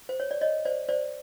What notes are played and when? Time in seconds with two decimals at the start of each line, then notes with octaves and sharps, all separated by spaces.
0.09 C5
0.20 C#5
0.31 D5
0.41 C#5 D#5
0.65 C5 D5
0.89 C5 D5